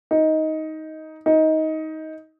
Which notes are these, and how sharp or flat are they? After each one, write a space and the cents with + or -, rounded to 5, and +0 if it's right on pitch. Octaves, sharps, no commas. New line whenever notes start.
D#4 +15
D#4 +20